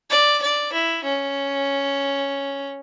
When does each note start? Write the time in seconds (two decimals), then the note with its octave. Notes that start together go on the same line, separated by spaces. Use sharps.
0.10 D5
0.42 D5
0.73 E4
1.04 C#4